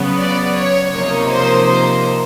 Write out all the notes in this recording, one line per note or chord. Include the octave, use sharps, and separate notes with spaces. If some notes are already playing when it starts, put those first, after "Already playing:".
Already playing: C#3 F#3 B3
D5
C#5
C3 F3 A#3 D#4 C#5
C5
C5